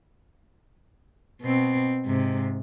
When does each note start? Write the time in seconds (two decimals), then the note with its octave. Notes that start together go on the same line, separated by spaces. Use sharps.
1.42 B2 C4
2.05 G#2 C3